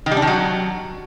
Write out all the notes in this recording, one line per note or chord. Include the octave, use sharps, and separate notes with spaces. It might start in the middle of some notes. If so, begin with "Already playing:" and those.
D#3
G3
D4
D#3
F#3